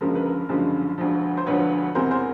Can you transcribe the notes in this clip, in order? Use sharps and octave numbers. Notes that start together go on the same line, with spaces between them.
F#1 F#2 D3 F3 G#3 A#4
B4
A#4
F#1 F#2 D3 F3 G#3
E1 D2 D3 F3
C5
E1 D2 D3 F3 B4 C#5
E1 E2 C3 E3 A#4 C5
A#4 C5